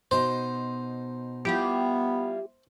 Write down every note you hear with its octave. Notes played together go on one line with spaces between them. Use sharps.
B2 D#4 C5
G3 B3 E4 F4 G4